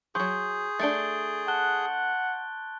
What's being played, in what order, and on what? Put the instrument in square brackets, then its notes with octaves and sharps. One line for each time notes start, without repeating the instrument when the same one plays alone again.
[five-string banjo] F3 F#3 [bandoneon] G#4 [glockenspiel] C6 C#6 G6
[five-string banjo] A3 D4 [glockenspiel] A6 D7 G7
[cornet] F#5 [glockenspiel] A5 F#6 G7